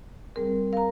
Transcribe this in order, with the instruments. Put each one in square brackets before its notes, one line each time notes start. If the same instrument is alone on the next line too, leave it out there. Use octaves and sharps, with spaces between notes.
[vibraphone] G3 C4 G#4 [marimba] A#4
[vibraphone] A#4 [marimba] F5 A#5